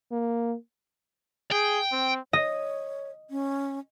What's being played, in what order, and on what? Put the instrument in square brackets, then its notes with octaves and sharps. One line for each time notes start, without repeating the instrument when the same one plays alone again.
[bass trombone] A#3
[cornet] G#4 [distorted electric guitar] G5
[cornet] C4
[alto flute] C#5 [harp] D#5
[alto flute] C#4